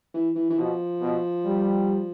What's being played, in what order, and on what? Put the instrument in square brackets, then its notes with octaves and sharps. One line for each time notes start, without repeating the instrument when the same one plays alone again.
[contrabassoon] E3
E3
E3
[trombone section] B2 [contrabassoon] F3
[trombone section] B2
G3